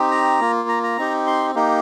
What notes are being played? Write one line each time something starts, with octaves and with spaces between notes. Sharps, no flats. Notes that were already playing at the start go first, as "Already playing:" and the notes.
Already playing: C4 D#4 G4
A#5
A#3 F4
A#5
A#5
C4 D#4 G4
C6
A#3 D#4 G4